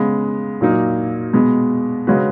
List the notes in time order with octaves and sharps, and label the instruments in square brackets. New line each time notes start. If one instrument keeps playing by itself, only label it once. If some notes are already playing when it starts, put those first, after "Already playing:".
Already playing: [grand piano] C#3 G#3 B3
A#2 F#3 A#3 D#4
B2 G#3 B3
C#3 G#3 C#4 F#4 B4